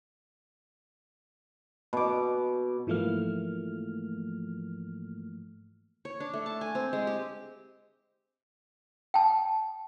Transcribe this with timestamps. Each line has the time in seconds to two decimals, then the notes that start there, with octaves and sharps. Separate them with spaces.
1.93 B2 D6
2.87 G#2 E3 F3 A3 A#3 F6
6.05 C#5
6.20 D4
6.33 A3
6.46 A5
6.61 G#5
6.75 C4
6.93 G#3
7.07 G4
9.14 G5 A5